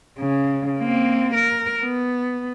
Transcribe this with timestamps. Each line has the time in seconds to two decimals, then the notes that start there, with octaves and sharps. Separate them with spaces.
0.19 C#3
0.79 A#3 C4
1.34 A#4
1.82 B3